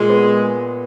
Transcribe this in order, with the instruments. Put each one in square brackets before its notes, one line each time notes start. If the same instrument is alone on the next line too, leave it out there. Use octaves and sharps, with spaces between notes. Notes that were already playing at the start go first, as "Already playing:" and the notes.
Already playing: [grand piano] A#2 [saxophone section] G#3
[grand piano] B3